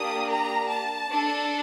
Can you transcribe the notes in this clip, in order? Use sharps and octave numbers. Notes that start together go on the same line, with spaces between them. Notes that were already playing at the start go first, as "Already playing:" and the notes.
Already playing: A#3 D4 G4 D#6
A#5
A5
D4 A4